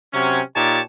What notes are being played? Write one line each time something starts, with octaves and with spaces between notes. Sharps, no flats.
C3 F#3 C4 C#4
A#2 D#4 G4 C#5 A5